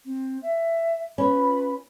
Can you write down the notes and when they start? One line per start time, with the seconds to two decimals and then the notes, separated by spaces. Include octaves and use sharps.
0.05 C4
0.42 E5
1.18 C#4 F4 B4 B5